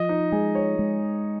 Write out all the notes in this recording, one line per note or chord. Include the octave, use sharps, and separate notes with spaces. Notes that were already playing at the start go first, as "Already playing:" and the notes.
Already playing: F3 D#5
D#4
G#3 G#4
C#5
G#3